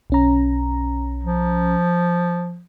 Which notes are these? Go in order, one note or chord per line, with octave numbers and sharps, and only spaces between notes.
B1 C#4 A#5
F3